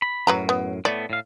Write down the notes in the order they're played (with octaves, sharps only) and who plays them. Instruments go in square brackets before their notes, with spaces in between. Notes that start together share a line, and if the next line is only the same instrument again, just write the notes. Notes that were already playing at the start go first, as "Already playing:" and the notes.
[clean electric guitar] B5
[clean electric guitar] F#2 A2 [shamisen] F#3 B4 A#5
[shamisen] B3
[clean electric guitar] A2 A3 B3 [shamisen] D5
[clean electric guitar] A2 F5